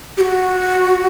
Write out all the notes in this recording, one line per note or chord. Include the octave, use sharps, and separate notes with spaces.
G4
F#4